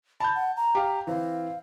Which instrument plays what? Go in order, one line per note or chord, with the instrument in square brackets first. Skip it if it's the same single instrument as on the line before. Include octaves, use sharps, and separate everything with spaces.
[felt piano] A5 G6 [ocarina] B5
[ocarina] F#5
A#5
[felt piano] G4 F5
[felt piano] E3 C4 [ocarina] F5